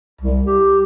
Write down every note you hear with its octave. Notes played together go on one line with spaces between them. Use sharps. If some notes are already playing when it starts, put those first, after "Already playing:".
C2
G4